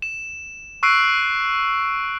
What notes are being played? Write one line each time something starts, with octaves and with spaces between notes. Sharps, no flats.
E7
C#6 E6 F#6 C7 D7
C7